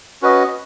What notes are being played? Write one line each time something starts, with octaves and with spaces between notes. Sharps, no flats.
C#4 F#4 B4 D#5